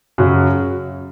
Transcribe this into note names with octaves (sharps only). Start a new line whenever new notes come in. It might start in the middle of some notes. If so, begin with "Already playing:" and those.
F#2 C#3 F#3